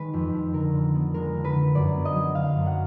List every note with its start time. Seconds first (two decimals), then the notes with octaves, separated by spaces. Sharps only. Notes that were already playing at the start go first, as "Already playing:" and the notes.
Already playing: D#3 G#3 B4
0.14 F2
0.34 F2
0.53 D3 A#4
0.74 D3
0.95 B3
1.14 G#3 A#4
1.34 D3
1.45 B4
1.55 D3
1.75 F#2 D5
1.95 B3
2.05 D#5
2.16 F#3
2.35 D3 F5
2.56 F#2
2.66 F#5